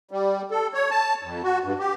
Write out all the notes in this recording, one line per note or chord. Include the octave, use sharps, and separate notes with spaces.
G3
A4
C#5
A5
F2
F#4
G2
G4